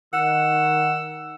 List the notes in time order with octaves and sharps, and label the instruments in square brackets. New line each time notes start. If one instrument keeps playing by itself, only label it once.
[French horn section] D#3 [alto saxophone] F#5 [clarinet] E6